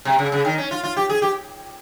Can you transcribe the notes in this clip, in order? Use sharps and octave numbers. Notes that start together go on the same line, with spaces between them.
C3
C#3
C#3
D#3
C#4
F4
F4
G4
G#4
G4